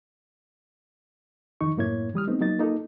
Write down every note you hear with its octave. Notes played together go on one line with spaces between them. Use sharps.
F2 D#3 D#4 C#6
F#2 A2 A#3 E4 C#5 G#6
E3 G3 D#6 F6
A3 B3 C4 D#4
F#3 A#3 D#4 A6
A#3 D#4 F4 A4